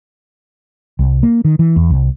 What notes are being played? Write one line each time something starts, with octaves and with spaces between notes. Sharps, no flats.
C2
A#3
D#3
E3
E2
C2